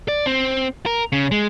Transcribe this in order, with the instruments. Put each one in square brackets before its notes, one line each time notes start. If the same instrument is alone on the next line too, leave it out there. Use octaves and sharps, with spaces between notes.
[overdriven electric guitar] D5
C4
A#4
C#3
G#3